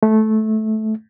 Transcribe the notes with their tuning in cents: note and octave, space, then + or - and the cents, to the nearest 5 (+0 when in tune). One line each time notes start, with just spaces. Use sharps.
A3 -15